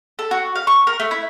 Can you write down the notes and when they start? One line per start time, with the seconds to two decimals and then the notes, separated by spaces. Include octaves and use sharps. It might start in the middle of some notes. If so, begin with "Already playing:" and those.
0.19 A4
0.31 F#4
0.56 F5
0.67 C#6
0.87 A#4
1.00 A3
1.11 E4